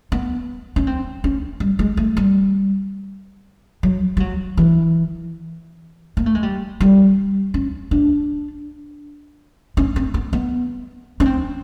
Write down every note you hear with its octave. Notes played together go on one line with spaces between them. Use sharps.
B3
C#4
C4
C#4
G3
G#3
A3
G3
F#3
G3
F#3
E3
A#3
A3
G#3
G3
G3
C#4
D4
C#4
C4
B3
B3
C#4
C4